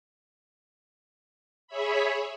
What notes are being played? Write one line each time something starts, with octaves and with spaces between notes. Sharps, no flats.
G#4 C#5 E5 B5